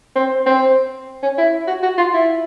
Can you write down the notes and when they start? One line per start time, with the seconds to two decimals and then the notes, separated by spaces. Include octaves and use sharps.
0.15 C4
0.46 C4
1.22 C#4
1.38 E4
1.67 F#4
1.83 F#4
1.98 F4
2.14 E4